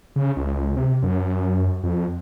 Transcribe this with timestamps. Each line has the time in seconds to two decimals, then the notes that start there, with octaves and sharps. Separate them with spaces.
0.16 C#3
0.36 C#2
0.77 C3
1.02 F#2
1.83 F2